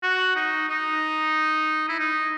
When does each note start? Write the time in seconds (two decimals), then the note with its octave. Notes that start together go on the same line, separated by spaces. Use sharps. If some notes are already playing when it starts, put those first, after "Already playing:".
0.03 F#4
0.36 D#4
0.69 D#4
1.89 E4
1.99 D#4